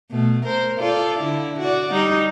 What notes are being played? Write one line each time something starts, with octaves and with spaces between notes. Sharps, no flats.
B2 A3
A#4 C5
F4 A4 D5
D3 E4
F#4 D5
G3 D#4